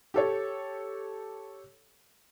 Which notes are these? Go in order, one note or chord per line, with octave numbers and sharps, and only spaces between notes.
G4 A4 C#5